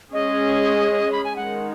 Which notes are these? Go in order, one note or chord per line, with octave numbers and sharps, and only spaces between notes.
G#3 C#4 G#4 D#5
B5
G#5
D#3 G#3 D#4 F#5